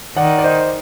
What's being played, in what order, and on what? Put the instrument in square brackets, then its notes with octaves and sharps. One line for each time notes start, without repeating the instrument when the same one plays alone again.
[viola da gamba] D#3 [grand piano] D5 F#5
[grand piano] D5
C5 D#5